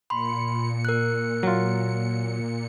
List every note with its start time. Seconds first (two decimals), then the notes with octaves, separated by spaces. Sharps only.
0.10 A#2 B5 C6 C#7
0.85 A#4 F#6
1.43 F#3 F4